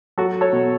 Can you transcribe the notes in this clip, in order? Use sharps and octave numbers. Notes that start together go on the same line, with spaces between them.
F#3 F#4 A4
A4 C#5
B2